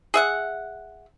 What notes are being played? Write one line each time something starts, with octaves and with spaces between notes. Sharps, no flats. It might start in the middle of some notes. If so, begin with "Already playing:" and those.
G#4 E5 F#5